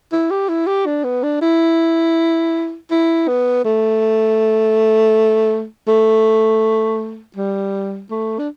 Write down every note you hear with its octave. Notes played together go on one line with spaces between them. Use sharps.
E4
G4
E4
G4
D4
B3
D4
E4
E4
B3
A3
A3
G3
A3
D4